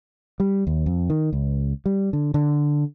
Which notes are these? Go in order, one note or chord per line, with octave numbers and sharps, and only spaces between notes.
G3
D#2
F2
D#3
C#2
G3
D3
D3